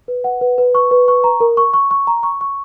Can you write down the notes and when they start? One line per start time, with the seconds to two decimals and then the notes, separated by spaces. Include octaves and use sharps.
0.08 B4
0.24 F#5
0.41 B4
0.58 B4
0.75 C#6
0.91 B4
1.08 C#6
1.24 A#5
1.40 A#4
1.57 C#6
1.74 C#6
1.91 C#6
2.07 A#5
2.23 C#6
2.41 C#6